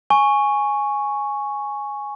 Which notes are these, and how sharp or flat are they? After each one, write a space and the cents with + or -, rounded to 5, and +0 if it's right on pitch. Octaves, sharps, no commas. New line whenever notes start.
G#5 +0 C#6 +0